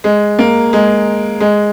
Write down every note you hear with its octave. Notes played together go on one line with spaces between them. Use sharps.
G#3
A#3
G#3
G#3